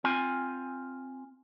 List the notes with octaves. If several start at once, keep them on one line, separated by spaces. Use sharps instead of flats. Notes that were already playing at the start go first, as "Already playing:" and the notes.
C4 F4 G#5